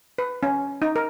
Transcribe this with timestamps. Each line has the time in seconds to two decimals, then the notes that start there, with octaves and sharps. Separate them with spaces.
0.18 B4
0.43 C#4
0.82 D#4
0.96 A#4